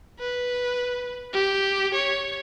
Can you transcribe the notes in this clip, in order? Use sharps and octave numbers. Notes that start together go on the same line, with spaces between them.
B4
G4
C#5